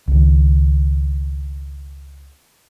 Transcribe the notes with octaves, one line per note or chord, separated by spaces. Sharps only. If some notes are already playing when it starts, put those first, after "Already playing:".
C#2 D#3